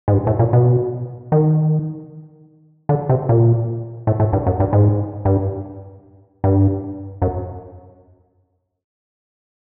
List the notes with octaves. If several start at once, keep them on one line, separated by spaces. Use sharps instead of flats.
G#2
G2
A2
A#2
B2
D#3
D3
C3
A#2
A2
A2
G2
F#2
G2
G#2
G2
G2
F#2